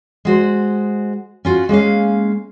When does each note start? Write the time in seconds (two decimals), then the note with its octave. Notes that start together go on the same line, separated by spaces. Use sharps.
0.25 G#3 F#4 C5
1.45 C#4 F4 F#4
1.69 G#3 A#3 C#4 F5